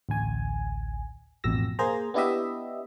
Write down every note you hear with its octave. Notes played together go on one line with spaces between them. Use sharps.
A1 D2 G#5
A1 F2 B2 E6 A#6
A#3 G#4 C5 A#5
B3 D4 E4 G4 D#5 E5